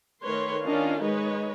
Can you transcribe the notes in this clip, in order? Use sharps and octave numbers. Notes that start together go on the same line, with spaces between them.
D#3 A3 A#4 B4 C#5 C6
D#3 C#4 D4 F4 D#5 F5
G#3 D#4 B4 C#5 D#5